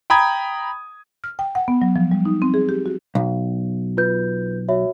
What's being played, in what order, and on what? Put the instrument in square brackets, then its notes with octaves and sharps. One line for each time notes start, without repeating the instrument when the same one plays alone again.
[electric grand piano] G5 A#5 B5 D#6 G#6
[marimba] F6
G5
F#5
B3
F#3
F3
G3
D#4
C4
G#4
G4
F#4
[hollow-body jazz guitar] B1
[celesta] F4 B4 G6
F#4 C#5 E5